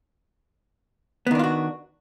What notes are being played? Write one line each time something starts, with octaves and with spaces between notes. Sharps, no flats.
D#3 B3 D4 F4 F#4